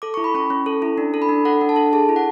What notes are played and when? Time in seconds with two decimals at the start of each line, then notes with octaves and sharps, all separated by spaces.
0.02 A4 D6
0.14 E4 C#6
0.24 B5
0.34 C#4 C#6
0.50 C#4
0.66 A4
0.82 E4
0.98 D4
1.14 A4
1.22 B5
1.29 D4
1.45 A4 F#5
1.61 D4
1.69 A5
1.76 A4
1.93 G#4 A5
2.09 E4
2.16 F#5